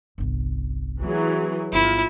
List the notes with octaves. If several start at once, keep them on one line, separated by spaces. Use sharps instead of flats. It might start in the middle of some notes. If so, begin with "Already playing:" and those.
G1 C2
E3 F#3 A3 C4 G#4
G1 D#3 E4 F4